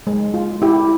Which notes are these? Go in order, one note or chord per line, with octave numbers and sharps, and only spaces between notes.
G#3
F4
E4 G4